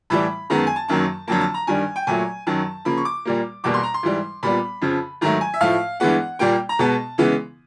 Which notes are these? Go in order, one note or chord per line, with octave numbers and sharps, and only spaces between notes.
A2 E3 G3 B5
F#2 D#3 G#3 B3 A#5
A5
G#5
A5
F#2 D#3 F#3 A#3 A5
F2 D3 F#3 A#3 A5
A5
A#5
G2 D#3 G3 G#5
G5
A#2 F#3 A3 G#5
F#2 D#3 F#3 A5
C#3 F3 A#3 B5
C#6
D6
A#2 G3 A#3
E2 B2 G3 A#3 D6
C6
A#5
C6
G#2 E3 G3
A#2 G3 B3 B5
F2 C#3 F3
G#2 D#3 F#3 A3 A#5
G#5
E5
A2 F3 A3 F5
G2 E3 G#3 B3 F#5
A#2 G3 A#3 G5
A#5
B2 G#3 B3 A5
C#3 E3 G#3 B3